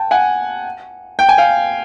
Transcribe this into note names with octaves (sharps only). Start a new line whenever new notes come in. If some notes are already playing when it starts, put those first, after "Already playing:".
Already playing: G5 A5
F#5 G#5
G5
G#5
F5 G5